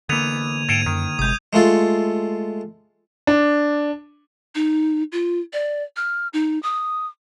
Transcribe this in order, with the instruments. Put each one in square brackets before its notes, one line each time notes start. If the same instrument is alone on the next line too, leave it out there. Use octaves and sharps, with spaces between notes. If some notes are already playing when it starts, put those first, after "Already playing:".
[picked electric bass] D3 A#3 [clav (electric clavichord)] E3 B3 [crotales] G#6 D#7 F7
[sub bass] G#2 [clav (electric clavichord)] A4 F5 G5 [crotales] G#6 D#7 F7
[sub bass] F#2 [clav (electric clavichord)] D#3
[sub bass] G1 [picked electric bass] C3 G#3 [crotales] D#6 G6
[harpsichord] G#3 A3 F4 A4
[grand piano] D4
[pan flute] D#4
F4
D5
F6
D#4
D#6